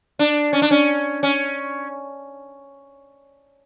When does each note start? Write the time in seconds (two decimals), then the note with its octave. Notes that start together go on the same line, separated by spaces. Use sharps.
0.19 D4
0.53 C#4
0.62 D4
0.71 C#4
1.23 C#4